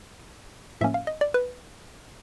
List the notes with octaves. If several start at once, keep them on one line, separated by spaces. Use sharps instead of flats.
A2 F3 A#3 C#4 E5
F5
D#5
D5
B4